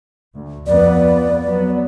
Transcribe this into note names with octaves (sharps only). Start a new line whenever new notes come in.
D2
F2 F3 B3 D5
F#3 B3